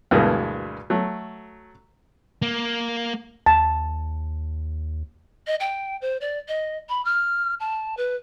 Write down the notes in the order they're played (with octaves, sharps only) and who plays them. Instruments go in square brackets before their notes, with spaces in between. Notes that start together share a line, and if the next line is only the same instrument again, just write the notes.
[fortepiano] D2 G2 B2 E3 G#3 A#3
F#3 A3
[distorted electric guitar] A#3
[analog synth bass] D#2 [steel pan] A5
[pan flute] D#5
G5
C5
D5
D#5
B5
F6
A5
B4